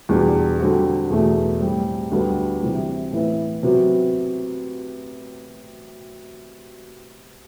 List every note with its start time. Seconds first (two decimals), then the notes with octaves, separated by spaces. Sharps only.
0.09 E2 B2 G3 D4
0.60 D3 G3 C4 F#4
1.10 E2 B2 A3
1.60 A2 G3 C4
2.11 D2 D3 G3 B3
2.62 C3 E3 G3
3.12 A2 E3 B3 E4
3.63 C3 F#3 B3 F#4